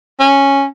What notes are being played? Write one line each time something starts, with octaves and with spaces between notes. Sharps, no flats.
C#4